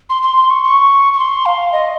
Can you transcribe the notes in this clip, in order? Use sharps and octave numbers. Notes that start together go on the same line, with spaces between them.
C6
C6
C6
C#6
C#6
C#6
C6
F5
D#5